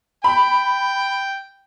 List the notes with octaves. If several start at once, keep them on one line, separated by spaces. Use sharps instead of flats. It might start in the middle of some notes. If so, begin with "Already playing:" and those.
G5 B5